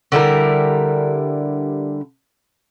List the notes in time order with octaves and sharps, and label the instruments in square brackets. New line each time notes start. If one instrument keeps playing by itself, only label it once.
[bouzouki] D3 G3 E4 A#4